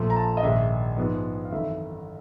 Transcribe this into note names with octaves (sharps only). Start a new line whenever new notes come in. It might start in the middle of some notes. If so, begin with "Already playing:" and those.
Already playing: A#1 A#2 F3 A3
A#5
A5
D#5
A#1 G#2 D#3 G#3 E5
G#2 F3 G#3 B3
F5
G#1 F#2 C#3 E3 A3 E5